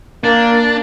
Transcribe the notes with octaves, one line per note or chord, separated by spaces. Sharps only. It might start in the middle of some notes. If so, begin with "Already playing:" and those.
A#3 D4